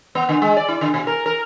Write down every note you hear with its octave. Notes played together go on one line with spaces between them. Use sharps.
B3
D3
G#3
D5
E4
D3
B2
A#4
A#4